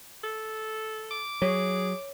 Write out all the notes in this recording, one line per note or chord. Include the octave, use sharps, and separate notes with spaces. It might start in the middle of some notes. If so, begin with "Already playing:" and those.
A4
D6
F#3 G#4 C#5